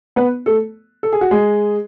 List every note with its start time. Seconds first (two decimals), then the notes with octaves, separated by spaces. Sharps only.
0.16 B3 B4
0.46 A3 A4
1.03 A4
1.13 G#4
1.21 F#4
1.31 G#3 G#4